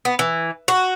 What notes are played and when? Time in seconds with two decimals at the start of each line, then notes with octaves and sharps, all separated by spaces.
0.05 B3
0.19 E3
0.68 F#4